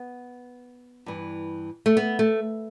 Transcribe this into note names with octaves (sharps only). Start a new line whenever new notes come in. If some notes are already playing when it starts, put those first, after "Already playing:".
Already playing: B3
G2 E3
A3
B3
A3